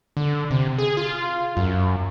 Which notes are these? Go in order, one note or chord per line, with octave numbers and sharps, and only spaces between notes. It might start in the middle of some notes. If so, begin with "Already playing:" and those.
D3
C3
G#4
F4
F#2